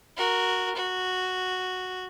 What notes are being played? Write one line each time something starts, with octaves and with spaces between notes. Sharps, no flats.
F#4 A#4
F#4